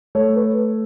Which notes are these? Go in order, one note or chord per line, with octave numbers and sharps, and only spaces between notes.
A3 C#5
B4